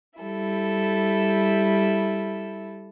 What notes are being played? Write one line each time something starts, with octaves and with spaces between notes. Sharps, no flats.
G3 E4 A4